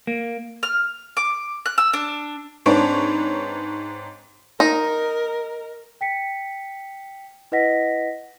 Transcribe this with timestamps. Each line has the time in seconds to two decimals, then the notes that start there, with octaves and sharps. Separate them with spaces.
0.07 A#3
0.63 F6
1.17 D6
1.66 F#6
1.78 E6
1.93 D4
2.66 G#2 C4 D4 B4 C#5 D7
4.60 D#4 A#4
6.01 G5 B6 C#7
7.52 E4 B4 D#5 F#5 A#6 B6